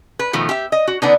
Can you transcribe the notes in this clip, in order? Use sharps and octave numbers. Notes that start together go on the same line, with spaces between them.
B4
B2 D#3 F3 A3
G4 E5
D#5
F#4
D3 B3 D4 D#4